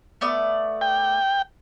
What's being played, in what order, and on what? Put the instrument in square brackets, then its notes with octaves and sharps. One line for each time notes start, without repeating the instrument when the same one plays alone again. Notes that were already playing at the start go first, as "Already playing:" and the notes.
[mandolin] A3 B3 D5
[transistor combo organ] G5